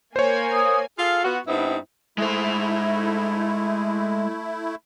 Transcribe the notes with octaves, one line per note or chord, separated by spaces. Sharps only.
A#3 C5 C#5 G#5
D#6
F4 G#4 A4 F5
B3 F4 F#4
G2 B3 C4 D#4 E4
G#3 A3 E4 C5